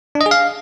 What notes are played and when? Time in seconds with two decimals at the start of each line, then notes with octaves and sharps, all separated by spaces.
0.15 D4
0.21 D#5
0.26 G#4
0.31 F5